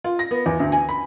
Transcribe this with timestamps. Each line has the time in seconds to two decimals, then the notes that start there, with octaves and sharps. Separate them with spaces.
0.04 F4
0.19 A#6
0.31 B3
0.46 E2
0.60 D2
0.72 G#5
0.89 B5